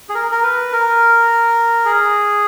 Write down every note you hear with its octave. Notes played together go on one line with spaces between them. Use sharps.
G#4
A#4
A#4
B4
A#4
G#4